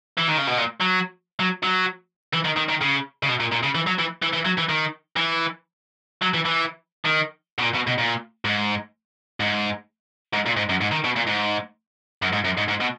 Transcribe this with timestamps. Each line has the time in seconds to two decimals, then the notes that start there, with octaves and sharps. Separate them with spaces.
0.18 E3
0.28 D#3
0.37 C#3
0.47 B2
0.58 A#2
0.80 F#3
1.40 F#3
1.63 F#3
2.34 E3
2.45 D#3
2.57 D#3
2.69 D#3
2.81 C#3
3.23 C#3
3.28 B2
3.40 A#2
3.52 A#2
3.63 C#3
3.75 E3
3.87 F#3
3.99 E3
4.22 E3
4.33 E3
4.45 F#3
4.58 E3
4.69 D#3
5.17 E3
6.22 F#3
6.34 E3
6.45 E3
7.05 D#3
7.59 B2
7.63 A#2
7.75 B2
7.87 B2
7.98 A#2
8.45 G#2
9.40 G#2
10.33 G#2
10.46 A#2
10.56 G#2
10.69 F#2
10.81 G#2
10.92 D#3
11.05 B2
11.16 A#2
11.28 G#2
12.22 F#2
12.33 G#2
12.45 F#2
12.57 G#2
12.69 G#2
12.81 B2